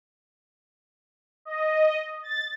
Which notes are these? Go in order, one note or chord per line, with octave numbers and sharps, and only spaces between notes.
D#5
A6